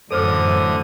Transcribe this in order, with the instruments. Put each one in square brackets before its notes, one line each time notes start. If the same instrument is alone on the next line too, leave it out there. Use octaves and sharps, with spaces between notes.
[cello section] F#2 A2 E3 [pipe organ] D3 D#6 [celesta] A4 C5 F6